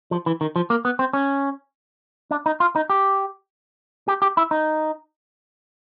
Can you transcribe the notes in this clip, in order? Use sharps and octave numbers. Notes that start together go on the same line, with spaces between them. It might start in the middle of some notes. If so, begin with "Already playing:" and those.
F3
E3
D#3
F3
A#3
B3
C4
C#4
D4
D#4
F4
D#4
G4
G4
G4
E4
D#4